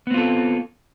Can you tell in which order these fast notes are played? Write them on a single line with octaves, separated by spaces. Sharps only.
B3 C4 F4 A4